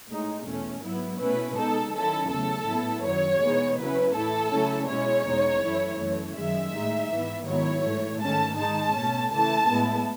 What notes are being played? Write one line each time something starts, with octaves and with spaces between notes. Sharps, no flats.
A2 G#3 D#4
E2 B2 A3 C#4
G#2 F#3 B3 E4
B2 A3 C#4 E4 B4
B2 G#3 D#4 A4
D#3 F#3 C#4 E4 A4
E2 C#3 F#3 A3 A4
A2 F#3 B3 E4
F#2 D#3 F#3 C#5
E2 B2 G#3 B3 D#4
C#3 F#3 C#4 E4 B4
A2 E3 A3 E4 A4
C#3 F#3 A3 C#4 E4
B2 G#3 C#4 E4 C#5
E2 B2 G#3 D#4
F#2 E3 A3 E4
F#2 E3 A3
F#2 D#3 G#3 E5
A2 G#3 D#4
G#2 E3 B3
G#2 D#3 F#3 B3 E4 C#5
G#2 E3 A3
G#2 D#3 A3 C#4 A5
D#3 G#3 D#4 A5
B2 A3 C#4
C#3 E3 A3 E4 A5
A2 G#3 B3 E4